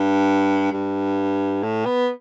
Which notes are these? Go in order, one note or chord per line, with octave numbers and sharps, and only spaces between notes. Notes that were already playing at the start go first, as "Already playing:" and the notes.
Already playing: G2
G2
A2
B3